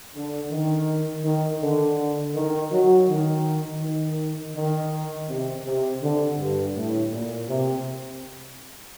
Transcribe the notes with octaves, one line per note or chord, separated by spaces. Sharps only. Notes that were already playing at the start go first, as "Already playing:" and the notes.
D3
D#3
D#3
D3
D#3
F#3
D#3
D#3
D#3
C3
C3
D3
G2
A2
A#2
C3